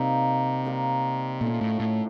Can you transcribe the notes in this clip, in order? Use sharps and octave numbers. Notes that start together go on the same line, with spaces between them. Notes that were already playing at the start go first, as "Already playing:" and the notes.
Already playing: C3 G3 A#3 D#4
G3 A#3 D#4
A#2 A3 C#4 F4
A2
A2